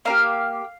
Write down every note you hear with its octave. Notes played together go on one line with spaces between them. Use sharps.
A#3 D#4 G4 F5